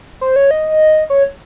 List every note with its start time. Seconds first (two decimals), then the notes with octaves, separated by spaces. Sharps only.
0.21 C5
0.36 C#5
0.51 D#5
1.10 C#5